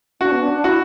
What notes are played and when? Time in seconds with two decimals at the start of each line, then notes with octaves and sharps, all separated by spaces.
0.20 D4 F#4
0.31 B3
0.42 D4
0.53 D4
0.64 E4 F#4